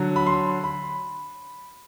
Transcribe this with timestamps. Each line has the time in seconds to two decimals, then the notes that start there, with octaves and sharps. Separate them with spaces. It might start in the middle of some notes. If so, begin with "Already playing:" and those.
Already playing: D3 F#3
0.16 B5
0.26 C6
0.64 B5